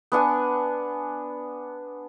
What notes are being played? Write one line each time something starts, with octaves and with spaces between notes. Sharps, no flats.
B3 D4 F#5 G#5